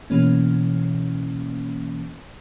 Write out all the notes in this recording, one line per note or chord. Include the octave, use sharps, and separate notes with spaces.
B2 E3 A#3 C#4